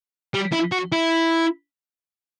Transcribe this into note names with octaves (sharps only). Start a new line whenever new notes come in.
G3
E4
F#4
E4